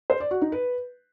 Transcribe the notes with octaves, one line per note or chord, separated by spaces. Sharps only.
C5
D5
F#4
D#4
B4